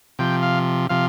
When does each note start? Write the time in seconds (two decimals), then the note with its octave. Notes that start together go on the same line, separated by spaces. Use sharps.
0.19 C3 F3 G5
0.43 F5
0.89 C3 F3 F5